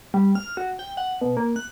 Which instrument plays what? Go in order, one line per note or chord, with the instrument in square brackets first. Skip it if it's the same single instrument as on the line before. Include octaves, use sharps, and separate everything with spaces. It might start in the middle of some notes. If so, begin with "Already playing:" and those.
[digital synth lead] G3
F6
F#4
G5
F#5
B2
A#3
F#6